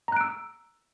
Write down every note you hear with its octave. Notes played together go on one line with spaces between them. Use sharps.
A#5 E6 F#6 D7